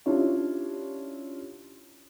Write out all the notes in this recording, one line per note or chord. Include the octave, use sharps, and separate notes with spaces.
C#4 D4 E4 F4 G4 C#5